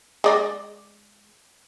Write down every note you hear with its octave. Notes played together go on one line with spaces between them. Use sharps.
G#3 D5 D#5